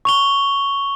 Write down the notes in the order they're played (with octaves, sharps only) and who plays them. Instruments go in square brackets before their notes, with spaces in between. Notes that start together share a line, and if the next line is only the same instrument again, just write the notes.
[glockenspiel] C#6 F7 G7